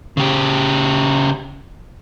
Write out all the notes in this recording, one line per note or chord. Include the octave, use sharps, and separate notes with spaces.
C#3 G4